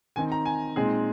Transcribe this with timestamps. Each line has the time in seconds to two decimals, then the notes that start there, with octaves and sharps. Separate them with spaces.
0.16 D#3 C4 D#4 G#5
0.32 A#5
0.46 G#5
0.76 A#2 G#3 C4 D#4 G#4